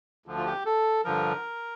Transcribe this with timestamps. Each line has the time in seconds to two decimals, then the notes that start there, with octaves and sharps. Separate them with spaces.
0.26 D2 D3 F3
0.37 F4
0.46 G4
0.66 A4
1.05 G2 D3 F3 A#4